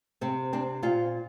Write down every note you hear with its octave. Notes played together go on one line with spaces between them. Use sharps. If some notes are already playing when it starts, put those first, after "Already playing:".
C3 C4
C4 D4
A#2 F4